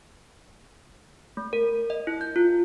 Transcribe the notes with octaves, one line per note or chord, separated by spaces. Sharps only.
A3
A#4
D#5
E4
G6
F4